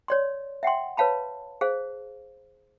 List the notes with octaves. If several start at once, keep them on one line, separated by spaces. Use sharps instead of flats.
C#5 D5 C6
E5 F#5 G5 C6
B4 C#5 F5 A5 B5
G#4 C5 F5